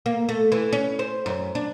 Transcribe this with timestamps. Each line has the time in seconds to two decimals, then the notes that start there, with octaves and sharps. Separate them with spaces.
0.06 A#3
0.29 A3
0.52 E3
0.73 C#4
0.99 C5
1.26 F#2
1.55 D4